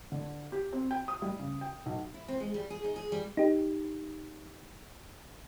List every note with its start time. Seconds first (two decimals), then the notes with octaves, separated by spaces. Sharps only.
0.12 D3
0.52 G4
0.73 C4
0.91 G5
1.08 D#6
1.22 G3
1.39 C#3
1.61 G5
1.86 B1
2.14 E4
2.28 C4
2.40 G#3
2.54 G3
2.70 G#4
2.84 D#4
2.96 G#4
3.12 G3
3.37 D#4 G4